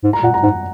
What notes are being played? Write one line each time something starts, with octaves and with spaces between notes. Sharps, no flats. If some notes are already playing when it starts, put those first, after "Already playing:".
G#2
A#5
A#2 F#5
A#5
G#2 F#5